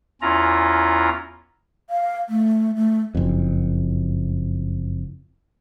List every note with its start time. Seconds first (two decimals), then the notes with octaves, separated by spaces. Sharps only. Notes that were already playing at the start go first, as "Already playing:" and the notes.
0.22 E2 C#4 E4 F4 A#5
1.90 F5
2.29 A3
2.75 A3
3.15 F#1 F2